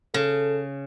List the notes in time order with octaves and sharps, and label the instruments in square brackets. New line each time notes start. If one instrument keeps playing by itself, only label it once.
[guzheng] C#3 [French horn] A4